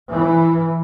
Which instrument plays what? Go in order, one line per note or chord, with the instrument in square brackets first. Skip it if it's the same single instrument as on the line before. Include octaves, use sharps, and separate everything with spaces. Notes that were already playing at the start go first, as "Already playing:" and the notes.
[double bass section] E3